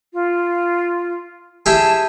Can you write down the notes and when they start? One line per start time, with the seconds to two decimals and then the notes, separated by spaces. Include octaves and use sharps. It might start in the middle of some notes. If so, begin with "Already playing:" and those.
0.13 F4
1.66 E4 G4 G#4 A5